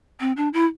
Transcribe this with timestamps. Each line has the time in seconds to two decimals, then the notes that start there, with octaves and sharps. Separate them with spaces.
0.20 C4
0.37 D4
0.53 E4